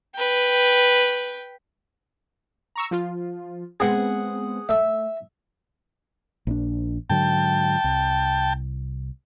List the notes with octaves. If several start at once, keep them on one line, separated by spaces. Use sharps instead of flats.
B4 G5
A#5 C#6 E6
F3 F4
G#3 B3 C4 G#4 F#5
A3 E5
A#1 D4
G#2 D3 F#3 G5 A5
C2